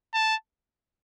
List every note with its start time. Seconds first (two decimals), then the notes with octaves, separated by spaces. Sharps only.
0.14 A5